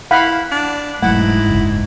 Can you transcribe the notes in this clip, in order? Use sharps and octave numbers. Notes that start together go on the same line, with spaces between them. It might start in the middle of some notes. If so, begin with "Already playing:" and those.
E4 F5 F#5 B5
D4
E1 G#2 F#3 A3 E4 F#5
F#1 C#2